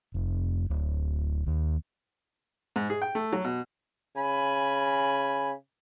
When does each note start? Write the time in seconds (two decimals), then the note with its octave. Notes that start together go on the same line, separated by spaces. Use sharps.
0.14 F1
0.70 D1
1.47 D#2
2.76 G#2
2.90 G#4
3.02 G5
3.15 A3
3.33 F#3
3.44 B2
4.16 C#3 G#5 B5